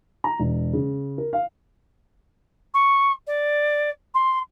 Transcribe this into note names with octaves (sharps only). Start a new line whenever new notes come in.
A#5
E1
C#3
A#4
F5
C#6
D5
C6